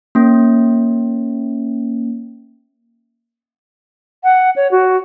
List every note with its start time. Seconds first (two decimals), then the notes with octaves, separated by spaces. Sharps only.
0.15 A#3 C#4
4.24 F#5
4.56 C#5
4.71 F#4